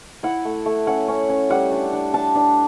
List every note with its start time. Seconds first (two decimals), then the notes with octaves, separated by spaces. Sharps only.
0.23 E4 F#5
0.45 A3
0.66 A3
0.87 C#4 F#5
1.08 C#4
1.29 C#4
1.50 G3 F#5
1.71 D4
1.93 D4
2.14 D4 A5
2.35 D4